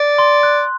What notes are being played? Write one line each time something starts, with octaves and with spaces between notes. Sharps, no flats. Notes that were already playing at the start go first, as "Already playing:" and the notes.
Already playing: D5
C6
F#6